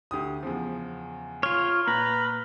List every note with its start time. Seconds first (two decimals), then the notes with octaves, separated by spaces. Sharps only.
0.11 D2 G4 D#6
0.43 E2 C#3 F3
1.43 F4 C#5 F6
1.88 A#2 B4 A#5